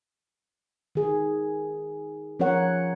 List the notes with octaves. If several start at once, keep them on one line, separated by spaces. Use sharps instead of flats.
D#3 G#4
F3 C#4 F4 A#4 C#5 F#5